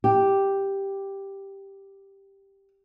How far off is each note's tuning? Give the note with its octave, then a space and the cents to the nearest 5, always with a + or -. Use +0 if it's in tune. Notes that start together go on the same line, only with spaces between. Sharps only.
G4 +0